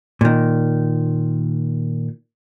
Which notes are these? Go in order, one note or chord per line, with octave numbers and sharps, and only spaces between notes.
A#2 D#3